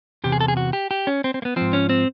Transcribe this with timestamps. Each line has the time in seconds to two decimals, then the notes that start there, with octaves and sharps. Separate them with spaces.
0.24 E2 C3 G4
0.32 G#4
0.41 A4
0.48 G#4
0.57 F#4
0.73 G4
0.91 G4
1.07 C#4
1.24 C4
1.34 C4
1.42 A#3
1.45 B3
1.56 G#2 F3 C4
1.73 C#4
1.89 C4